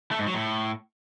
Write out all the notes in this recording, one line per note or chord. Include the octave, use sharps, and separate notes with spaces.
A3
G#2
F#3
A2